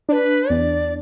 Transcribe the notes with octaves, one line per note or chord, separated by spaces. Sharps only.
D4 B4 D5
E2 D5